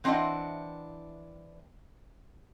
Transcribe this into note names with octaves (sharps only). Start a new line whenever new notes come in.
E3 C4 D4 E4 D#5 F#5